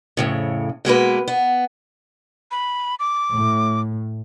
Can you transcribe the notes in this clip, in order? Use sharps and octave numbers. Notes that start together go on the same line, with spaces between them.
F2 A2 C#3
B2 G#3 A#3 B4
B3
B5
D6
A2